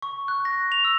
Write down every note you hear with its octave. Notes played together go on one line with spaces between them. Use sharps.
C#6
F#6
A#6
F7
E6